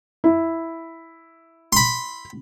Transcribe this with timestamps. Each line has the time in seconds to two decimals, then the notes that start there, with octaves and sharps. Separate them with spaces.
0.24 E4
1.73 B5 C6